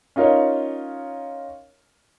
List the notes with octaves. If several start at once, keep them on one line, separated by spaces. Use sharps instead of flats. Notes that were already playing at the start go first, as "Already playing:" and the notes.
C#4 D#4 F4 A#4 C#5